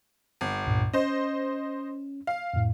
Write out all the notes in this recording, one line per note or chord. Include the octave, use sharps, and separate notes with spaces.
G1
C#2 G2 A#2
C#4 C5 D#5
F5
F2 A2